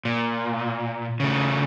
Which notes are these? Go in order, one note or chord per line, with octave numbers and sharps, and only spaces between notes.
A#2
C#3 A3